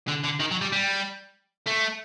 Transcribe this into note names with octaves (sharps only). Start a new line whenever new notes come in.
D3
D3
D#3
F#3
G3
G3
A3